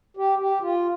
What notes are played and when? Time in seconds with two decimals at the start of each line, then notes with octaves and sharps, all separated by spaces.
0.17 G4
0.39 G4
0.61 F4